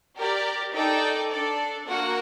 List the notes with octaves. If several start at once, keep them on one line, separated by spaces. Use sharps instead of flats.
G4 A#4 D5
D#4 A4 D5 G5
D4 A4 D5
A#3 F#4 A#4 F#5